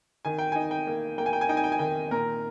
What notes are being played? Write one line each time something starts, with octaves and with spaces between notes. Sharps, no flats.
D#3 G#5
G5
D#4 G#5
G5
A#3
A#3 G5
G#5
G5
G#5
D#4 G5
G#5
G5
G#5
D#3 G5
A#2 A#4